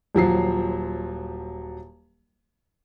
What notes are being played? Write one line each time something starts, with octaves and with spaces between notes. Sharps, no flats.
D#1 F3 F#3 C7